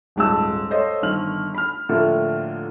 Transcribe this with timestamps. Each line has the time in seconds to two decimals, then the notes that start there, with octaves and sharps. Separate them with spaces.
0.16 D#1 G#2 A5 E6
0.70 A4 C5 C#5 D#5 F5
1.02 G1 D#3 F6 F#7
1.55 B5 F6
1.89 A2 D3 F3 A#3